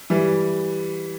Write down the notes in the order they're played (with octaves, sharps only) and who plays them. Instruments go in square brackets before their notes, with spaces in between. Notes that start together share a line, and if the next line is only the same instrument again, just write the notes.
[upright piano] E3 G3